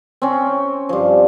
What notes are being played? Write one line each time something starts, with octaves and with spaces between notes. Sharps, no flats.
C4 C#4
G2 F3